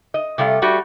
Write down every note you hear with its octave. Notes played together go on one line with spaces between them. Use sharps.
D#5
C3 G3 A3 F5
G3 A3 F#4